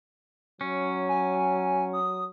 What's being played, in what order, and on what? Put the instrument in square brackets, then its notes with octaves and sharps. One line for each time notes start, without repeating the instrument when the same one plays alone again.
[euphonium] F#3 [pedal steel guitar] C#4
[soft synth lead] G#5
D#6